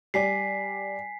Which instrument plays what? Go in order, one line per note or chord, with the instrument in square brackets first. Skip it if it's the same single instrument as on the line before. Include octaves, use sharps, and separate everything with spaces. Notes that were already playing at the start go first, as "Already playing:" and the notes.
[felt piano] G3 D5 [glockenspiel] G#5 B6 C7